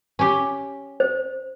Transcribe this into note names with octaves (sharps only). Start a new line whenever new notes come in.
C#4 G4
C5